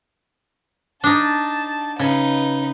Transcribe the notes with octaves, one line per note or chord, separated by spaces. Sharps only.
D4 D#4 A5
C#3 D#4 B4